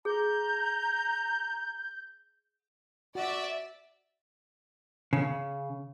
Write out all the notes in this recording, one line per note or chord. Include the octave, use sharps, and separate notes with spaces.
G#4 A#5 G6
F#4 D5 E5
C#3